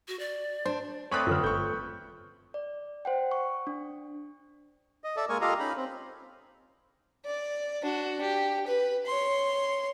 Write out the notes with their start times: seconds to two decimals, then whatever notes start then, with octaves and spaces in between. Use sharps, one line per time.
0.08 F#4
0.19 D5
0.66 D4 C5
1.11 A3 C4 C#5 D5 B5 C#6 D#6 F#6
1.27 F#2 D3 F4 A4 B4
1.44 G1 C#6 G6
2.54 D5
3.05 C5 F#5 G5
3.31 C#6
3.67 D4
5.04 D#5
5.16 A4 D5 E5
5.29 G#3 A#3 A#4 G#5 C#6
5.41 F4 G4 A4 D#5 F5 A#5
5.60 C#4 D#4 B5
5.77 C4
7.25 D5
7.83 D4 F#4
8.21 G4
8.67 B4
9.06 C#5 C6